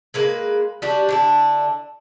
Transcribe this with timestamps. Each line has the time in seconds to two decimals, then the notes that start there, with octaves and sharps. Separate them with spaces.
0.14 G#3 A#3 B4
0.82 G3 D4 F#4 G4
1.09 D3 D4 E4